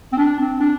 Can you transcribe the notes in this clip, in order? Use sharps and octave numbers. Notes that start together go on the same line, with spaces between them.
C4
D4
C4
D4